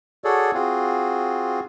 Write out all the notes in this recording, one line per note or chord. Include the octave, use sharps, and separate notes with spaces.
F#4 G#4 A4 C#5 D5
C4 F4 F#4 G#4